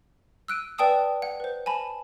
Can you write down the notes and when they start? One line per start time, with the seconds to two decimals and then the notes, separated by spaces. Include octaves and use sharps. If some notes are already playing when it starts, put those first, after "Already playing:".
0.48 E6 F#6 D7 D#7
0.78 B4 D5 G5 A5 D#6 E6
1.22 F#5
1.40 B4 C5
1.66 G#5 A5 B5